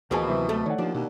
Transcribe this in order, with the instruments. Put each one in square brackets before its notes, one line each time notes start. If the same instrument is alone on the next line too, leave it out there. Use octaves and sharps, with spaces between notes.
[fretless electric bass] D2 [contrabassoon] B2 [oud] E3 F3 A#3 [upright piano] G#4 D#5 A5
[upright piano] C3 F#3
[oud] A3
[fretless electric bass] D#3 [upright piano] C#5 D5 F#5
[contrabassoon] D#2 [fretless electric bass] F3 [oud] D4
[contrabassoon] D#2 [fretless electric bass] B2